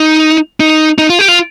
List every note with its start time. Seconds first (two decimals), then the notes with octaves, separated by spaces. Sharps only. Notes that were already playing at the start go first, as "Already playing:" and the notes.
Already playing: D#4
0.60 D#4
0.98 D#4
1.09 F4
1.19 G4
1.28 F4